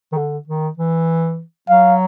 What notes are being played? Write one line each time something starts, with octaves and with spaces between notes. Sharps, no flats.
D#3
D3
D#3
E3
F#3 F5